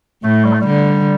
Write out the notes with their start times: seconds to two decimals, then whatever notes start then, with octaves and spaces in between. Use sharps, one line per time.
0.24 A2 A3
0.45 G3
0.53 A3
0.60 G3
0.67 D3